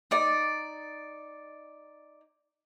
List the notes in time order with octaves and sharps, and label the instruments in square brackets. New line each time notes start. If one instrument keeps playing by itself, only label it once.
[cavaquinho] D#4 D5